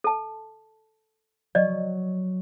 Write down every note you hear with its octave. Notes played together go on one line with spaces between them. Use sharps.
A4 A5
F#3 D5 D#5